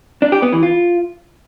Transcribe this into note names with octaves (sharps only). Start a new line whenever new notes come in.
D4
G4
B3
E3
F4